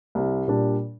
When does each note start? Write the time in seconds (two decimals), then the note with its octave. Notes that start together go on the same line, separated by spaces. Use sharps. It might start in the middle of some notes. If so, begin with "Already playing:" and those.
0.15 C2
0.48 A#2 G3 D4